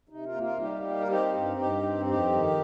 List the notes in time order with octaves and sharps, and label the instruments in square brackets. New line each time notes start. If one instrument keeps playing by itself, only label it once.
[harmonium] C3 D#4
F4 A#4
A#3
F4 A#4
G3 D#4 G4
A#3
A#4
C4 D#4 G4
G2
G2 D#4 G4
C4
F2 D#4 G4
D#3